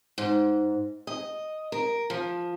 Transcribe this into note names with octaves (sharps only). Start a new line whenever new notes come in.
G#2
D#5
A#4
F3